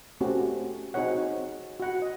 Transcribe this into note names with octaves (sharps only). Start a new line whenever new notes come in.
A3 C4 C#4 F#4 G4
C4 D#4 F#4 G#4 C#5 F#5
F#4 F#5
D#5